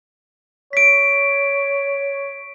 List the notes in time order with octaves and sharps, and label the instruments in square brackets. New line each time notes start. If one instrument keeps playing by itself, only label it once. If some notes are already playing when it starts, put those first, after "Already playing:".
[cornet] C#5 [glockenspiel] B6 D7